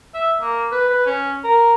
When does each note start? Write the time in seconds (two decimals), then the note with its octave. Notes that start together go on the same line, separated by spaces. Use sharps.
0.15 E5
0.41 A#3
0.72 B4
0.90 B4
1.06 C#4
1.44 A#4